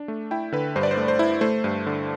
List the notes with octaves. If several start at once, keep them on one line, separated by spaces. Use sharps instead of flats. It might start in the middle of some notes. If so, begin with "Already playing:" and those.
Already playing: D4
A3
E4 G5
D3 B4
G2 C5
D5
C5
A3
C5
E4
A3 C5
G2
D3